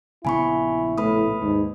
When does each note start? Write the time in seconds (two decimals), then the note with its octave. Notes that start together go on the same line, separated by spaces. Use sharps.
0.25 A#1 C#3 B3 E4 G#5 B5 C#6
0.98 A2 B4 B5 D#6
1.41 D#2 G#2